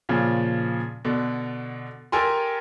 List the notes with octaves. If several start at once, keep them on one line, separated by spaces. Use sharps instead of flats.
A#2 C#3 F3
B2 D3
G4 A4 A#4 G#5 A#5 C6